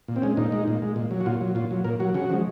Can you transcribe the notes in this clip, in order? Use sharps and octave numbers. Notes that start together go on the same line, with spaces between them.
A#2
C4
G#3 C#4
A#2 D#4
G#3
A#2
G#3
A#2
F#3
F#4
A#2 F4
F#3
A#2 F4
F#3
A#2 A#4
F#3 F#4
C#3 F#4
F3 G#3